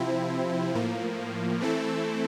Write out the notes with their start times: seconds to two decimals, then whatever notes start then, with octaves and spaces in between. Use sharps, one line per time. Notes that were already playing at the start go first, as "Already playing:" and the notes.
Already playing: C3 F3 C4 E4
0.75 A2 F3 A#3
1.61 E3 A3 C4 E4 A4